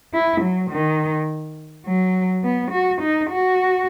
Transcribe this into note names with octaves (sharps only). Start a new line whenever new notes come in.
E4
F#3
D#3
F#3
B3
F#4
D#4
F#4